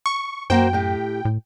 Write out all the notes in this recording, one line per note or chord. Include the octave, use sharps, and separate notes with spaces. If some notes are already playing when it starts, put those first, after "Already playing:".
C#6
F#2 A#3 F#4 C5 G5
A2 G4
A2